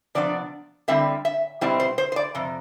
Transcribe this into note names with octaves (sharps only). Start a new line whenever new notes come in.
C3 F3 B3 D4 D5
D3 G3 C4 E4 E5
E5
B2 G3 C4 E4 D5
C5
C5
C5
D5
F2 C3